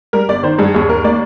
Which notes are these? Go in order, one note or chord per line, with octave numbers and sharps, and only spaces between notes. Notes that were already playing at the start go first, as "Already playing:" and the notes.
G3 A#4
G1 D5
D#3 C5
G2 G#4
D#2 G#4
D#2 A#4
A#3 D5